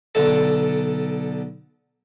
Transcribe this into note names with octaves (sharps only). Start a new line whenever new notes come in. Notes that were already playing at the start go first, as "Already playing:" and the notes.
B1 D3 A4